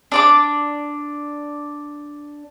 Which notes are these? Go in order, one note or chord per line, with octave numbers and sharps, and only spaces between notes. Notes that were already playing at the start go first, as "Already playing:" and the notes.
D4 D5 D6